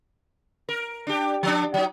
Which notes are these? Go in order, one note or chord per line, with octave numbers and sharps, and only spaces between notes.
A#4
D4 G4
F3 D4
F#3 D#4